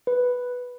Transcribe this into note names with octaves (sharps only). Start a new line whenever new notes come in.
B4